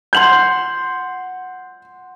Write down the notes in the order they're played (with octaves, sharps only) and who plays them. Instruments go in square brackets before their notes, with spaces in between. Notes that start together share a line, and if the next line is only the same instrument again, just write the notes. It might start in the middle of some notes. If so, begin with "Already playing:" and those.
[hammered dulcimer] F#5 C6 [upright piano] G6 F#7